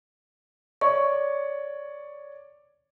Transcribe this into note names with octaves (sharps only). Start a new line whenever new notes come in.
C#5 D5 C#6